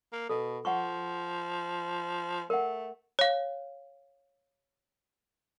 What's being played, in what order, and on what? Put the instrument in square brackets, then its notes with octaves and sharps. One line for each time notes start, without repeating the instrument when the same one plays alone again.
[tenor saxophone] A#3
[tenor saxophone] B2 [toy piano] A4
[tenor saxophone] F3 [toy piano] F#5 C#6
[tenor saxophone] A3 [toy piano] A#4 F#5
[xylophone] C#5 F5